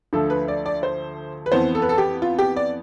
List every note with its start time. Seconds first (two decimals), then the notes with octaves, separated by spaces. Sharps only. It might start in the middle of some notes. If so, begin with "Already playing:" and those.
0.13 D2 D3 F3 A3 A4
0.30 B4
0.48 D5
0.66 D5
0.83 C5
1.46 B4
1.52 F2 E3 B3 C5
1.75 A4
1.82 B4
1.89 A4
1.98 G4
2.22 F4
2.39 G4
2.56 D5